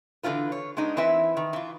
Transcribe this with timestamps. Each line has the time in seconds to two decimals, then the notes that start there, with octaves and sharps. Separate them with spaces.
0.23 D3 E3 D4 F4 B4
0.52 C#5
0.77 G#3 B3 D4 D#4
0.97 E3 C4 E4 B4 E5
1.37 D#3
1.53 E3 F4